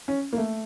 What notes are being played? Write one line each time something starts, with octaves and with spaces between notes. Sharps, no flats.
C#4
A#3
A3